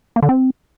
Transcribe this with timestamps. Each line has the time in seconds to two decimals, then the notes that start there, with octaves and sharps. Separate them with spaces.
0.16 A#3
0.22 D3
0.29 C4